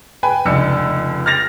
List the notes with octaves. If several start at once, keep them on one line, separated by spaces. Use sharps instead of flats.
B4 G5 G#5 B5
F1 C#2 D4 E6 C#7
F6 A6 A#6 F7